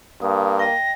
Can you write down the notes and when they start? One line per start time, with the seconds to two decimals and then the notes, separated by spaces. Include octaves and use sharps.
0.22 G2 A#3 D#6
0.59 D#5 G5 A#6